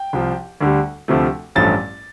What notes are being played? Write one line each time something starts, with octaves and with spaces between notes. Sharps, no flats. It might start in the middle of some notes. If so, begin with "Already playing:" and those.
Already playing: G5
C2 C3 F3
D2 D3 G3
D2 C3 F3 A3
A1 G2 F3 A3 A6